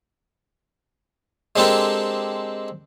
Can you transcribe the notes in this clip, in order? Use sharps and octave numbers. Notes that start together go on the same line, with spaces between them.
G#3 C4 D4 G4 A4 A#4